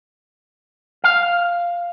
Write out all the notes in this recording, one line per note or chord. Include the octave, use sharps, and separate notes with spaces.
F5